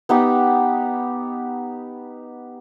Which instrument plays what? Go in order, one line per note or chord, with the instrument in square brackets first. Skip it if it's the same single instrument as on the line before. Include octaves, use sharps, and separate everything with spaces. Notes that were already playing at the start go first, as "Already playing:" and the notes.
[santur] B3 D#4 G4